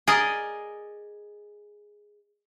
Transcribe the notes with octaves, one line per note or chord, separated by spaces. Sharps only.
G#4 A#4 D5 D#5